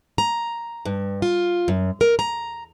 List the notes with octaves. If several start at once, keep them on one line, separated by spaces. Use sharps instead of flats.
A#5
G2
F4
F#2
A#4
A#5